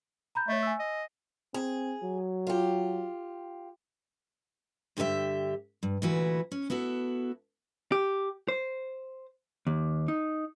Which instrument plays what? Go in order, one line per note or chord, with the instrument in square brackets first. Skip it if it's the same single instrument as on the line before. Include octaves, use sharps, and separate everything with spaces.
[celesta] A#5 B5 G6
[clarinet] A3 [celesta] C#5 D#5
[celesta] G#5 E6
[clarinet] D#5
[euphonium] C4 [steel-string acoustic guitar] G#4
[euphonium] F#3
[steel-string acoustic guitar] F4 G4
G2 D3 G4 A4 E5
G2
D2 A#2 E3 E4 F#4 B4
C#4
B3 E4 F#4 A4
[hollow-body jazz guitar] G4
C5
D#2
D#4